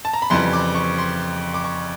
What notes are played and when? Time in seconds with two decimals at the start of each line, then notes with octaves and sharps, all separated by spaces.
0.05 A5
0.14 A#5
0.22 B5
0.30 F2 C#3 E3 G3 C6
0.53 D6
0.75 C#6
0.98 C6
1.54 D6
1.64 C#6